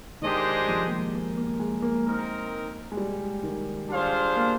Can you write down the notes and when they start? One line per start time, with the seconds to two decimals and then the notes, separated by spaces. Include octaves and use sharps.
0.22 D#3 G#3 D4 G4 C5 D#5
0.62 G3
0.69 F3
0.86 A#3
0.91 G#3
1.15 A#3
1.37 A#3
1.59 G#3
1.82 A#3
2.06 C4 D#4 A#4
2.92 G#3
2.97 G3
3.43 D#3
3.89 G3 D4 F4 G#4 C5 F5
4.36 A#3